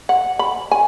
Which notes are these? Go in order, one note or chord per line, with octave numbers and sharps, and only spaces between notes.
F#5
B5
G#5